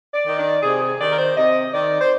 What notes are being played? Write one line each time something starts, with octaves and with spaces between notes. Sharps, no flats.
D5
D#3
D5
C3 G#4
G#4
D#3 D5
A#4
C5
C3 D#5
D#3 D5
C5